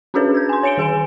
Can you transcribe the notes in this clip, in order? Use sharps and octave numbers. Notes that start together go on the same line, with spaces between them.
C#4 D4 F#4 G#4 B4 C#5
G6 G#6
G#5 C6
C#5 G#5 C#7 D7 G7
D#3 G#4 G#5 D7